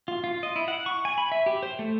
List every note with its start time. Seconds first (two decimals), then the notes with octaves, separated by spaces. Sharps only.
0.08 F4
0.24 F4
0.43 D#5
0.56 E4
0.68 F#5
0.86 C#6
1.05 G#5
1.18 B5
1.32 E5
1.46 G4
1.63 C5
1.79 A3